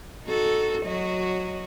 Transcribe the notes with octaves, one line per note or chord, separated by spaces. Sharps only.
D#4 F#4 A4
F#3 F#4 D#5